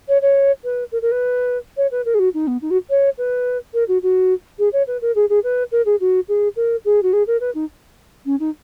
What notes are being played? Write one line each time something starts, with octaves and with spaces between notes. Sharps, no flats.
C#5
C#5
B4
A#4
A#4
B4
C#5
B4
A#4
G#4
F#4
D#4
B3
D#4
F#4
C#5
B4
A#4
F#4
F#4
G#4
C#5
B4
A#4
G#4
G#4
B4
A#4
G#4
F#4
G#4
A#4
G#4
F#4
G#4
A#4
B4
D#4
C#4
D#4